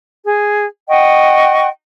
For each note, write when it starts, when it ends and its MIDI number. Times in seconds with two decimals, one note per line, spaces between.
0.24 0.65 68
0.89 1.68 75
0.89 1.68 78
0.89 1.68 79
0.89 1.68 85